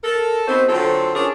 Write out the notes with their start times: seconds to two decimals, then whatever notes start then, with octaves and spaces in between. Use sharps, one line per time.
0.04 A4 A#4
0.47 B3 C4 D#4 F#4 C5
0.69 D3 F#3 C4 F4 A4
1.15 C#4 D4 F4 G#4 A#4 C#5